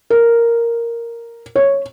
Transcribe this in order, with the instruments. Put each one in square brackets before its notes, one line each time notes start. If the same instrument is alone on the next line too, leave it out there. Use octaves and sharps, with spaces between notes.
[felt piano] A#4
C#5